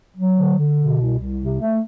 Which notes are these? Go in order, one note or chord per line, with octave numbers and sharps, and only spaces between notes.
F#3
D3
D3
B2
C2
C2
C3
A3